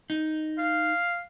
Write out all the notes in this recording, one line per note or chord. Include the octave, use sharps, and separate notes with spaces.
D#4
F5